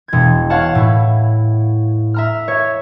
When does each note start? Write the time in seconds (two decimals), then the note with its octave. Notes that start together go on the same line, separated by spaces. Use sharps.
0.08 E1 G#6
0.50 C#5 F5 F#5 A5
0.75 A2 E4
2.14 E5 A#5 F6
2.48 C#5 E5